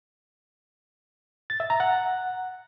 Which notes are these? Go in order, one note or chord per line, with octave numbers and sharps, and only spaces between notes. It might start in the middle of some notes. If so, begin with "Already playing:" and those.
A6
E5
A#5
F#5